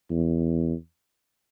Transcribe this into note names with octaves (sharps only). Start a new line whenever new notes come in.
E2